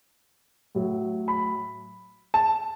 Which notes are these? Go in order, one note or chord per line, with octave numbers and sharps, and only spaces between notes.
A2 F#3
B5
A5